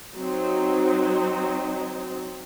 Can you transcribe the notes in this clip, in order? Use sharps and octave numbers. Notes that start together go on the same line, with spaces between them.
F#3 C4 D#4